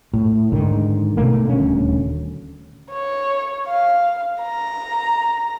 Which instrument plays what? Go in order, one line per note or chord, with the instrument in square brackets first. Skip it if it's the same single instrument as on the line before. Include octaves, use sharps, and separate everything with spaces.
[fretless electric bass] A2
G#2 D3 D#3
B2 A3 A#3
D#1 D2 C#4
[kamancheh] C#5
F5
A#5